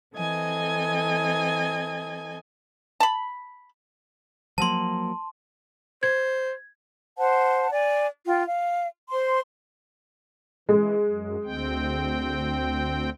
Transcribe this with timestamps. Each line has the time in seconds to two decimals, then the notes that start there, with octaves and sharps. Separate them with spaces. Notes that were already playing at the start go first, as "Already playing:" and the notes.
0.15 E3 C4 A4 D#5 G#5 G#6
3.00 A5 B5
4.58 F3 F#3 A#3 A5 C6
6.03 C5 G#6
7.17 C5 F#5 A5
7.71 D5 G#5
8.26 F4 G5
8.47 F5
9.11 C5 C6
10.69 E3 G#3
11.06 F#2
11.44 D2 C4 G5